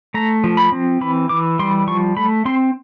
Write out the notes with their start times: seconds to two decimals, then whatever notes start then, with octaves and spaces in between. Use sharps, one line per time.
0.14 A3 A#5
0.44 F3
0.57 B5
0.72 C4
1.01 E3 B5
1.29 E3 D6
1.59 G3 C6
1.87 F3 C#6
2.17 A3 B5
2.45 C4 C6